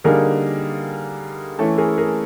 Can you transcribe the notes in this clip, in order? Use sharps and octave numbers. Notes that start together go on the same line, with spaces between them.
D3 G3 A#3 D#4 G#4 A#4
E3 A3 C#4 E4 A4
G#4 A#4
G#4 A#4